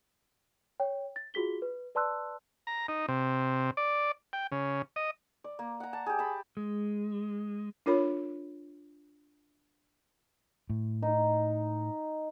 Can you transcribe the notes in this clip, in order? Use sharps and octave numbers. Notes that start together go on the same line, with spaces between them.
C#5 G5
A6
F4 F#4 G#4 B6 G7
B4
B4 D5 A5 C6 E6 F#6
A#5
D#4
C3
D5
G5
C#3
D#5
D5
A#3
F#5 A#5
A5
G4 G#4
A5 B5
G#3
D4 F4 A#4 C#5 B5
A2
D#4